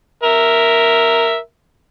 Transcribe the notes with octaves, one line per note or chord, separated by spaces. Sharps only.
A#4 E5